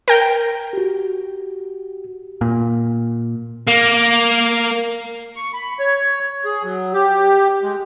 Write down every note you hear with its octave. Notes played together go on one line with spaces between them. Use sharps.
A#4 G5
F#4 G4
A#2
A#3
C#6
B5
C#5
G#4
F#3
G4
G#3